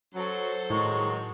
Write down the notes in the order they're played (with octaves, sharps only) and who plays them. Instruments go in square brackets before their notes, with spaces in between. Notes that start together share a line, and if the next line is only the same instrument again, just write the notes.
[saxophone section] F#3 [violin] A4 C5
[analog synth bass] A2 [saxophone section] D#3 F#3 G#3 [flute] C#6